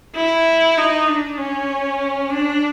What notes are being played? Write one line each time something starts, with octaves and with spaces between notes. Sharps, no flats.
E4
D#4
D4
C#4
D4